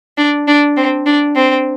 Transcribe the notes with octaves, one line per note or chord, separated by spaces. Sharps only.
D4
D4
C4
D4
C4